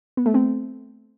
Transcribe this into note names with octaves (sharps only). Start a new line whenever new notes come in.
B3
A3
C4